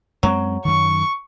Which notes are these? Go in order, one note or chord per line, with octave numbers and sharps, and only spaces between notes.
F#2 F#3 G#3 C4
F#2 D#3 C#6